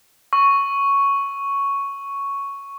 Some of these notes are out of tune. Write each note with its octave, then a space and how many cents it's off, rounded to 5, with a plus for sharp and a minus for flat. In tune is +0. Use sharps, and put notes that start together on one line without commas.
C#6 +0 E6 +0